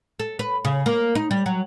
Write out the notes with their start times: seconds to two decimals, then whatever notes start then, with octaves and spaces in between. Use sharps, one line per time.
0.19 A4
0.39 B4
0.65 C#3
0.86 A#3
1.15 D#4
1.31 G3
1.46 F#3